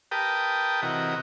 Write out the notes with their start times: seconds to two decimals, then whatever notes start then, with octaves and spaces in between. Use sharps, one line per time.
0.11 G4 A#4 B4 G5 A5 D#6
0.82 C3 E3 F#4 A#4 D#5